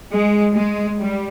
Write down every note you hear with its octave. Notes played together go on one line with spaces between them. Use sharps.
G#3
G#3
G3